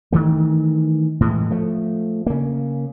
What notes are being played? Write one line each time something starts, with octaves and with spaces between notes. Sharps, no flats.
D#3 E3 A3
A2 E3 G#3
F3 A3
C#3 A#3